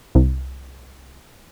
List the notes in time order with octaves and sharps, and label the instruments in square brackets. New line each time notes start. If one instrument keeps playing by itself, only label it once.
[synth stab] C2